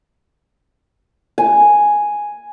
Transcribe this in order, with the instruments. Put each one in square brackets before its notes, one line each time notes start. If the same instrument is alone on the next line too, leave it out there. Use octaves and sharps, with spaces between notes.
[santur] G#5